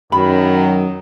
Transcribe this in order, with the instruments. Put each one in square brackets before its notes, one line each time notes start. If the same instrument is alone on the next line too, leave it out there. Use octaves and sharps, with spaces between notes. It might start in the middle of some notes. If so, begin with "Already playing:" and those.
[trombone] F#2 [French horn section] D#3 F#3 [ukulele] B5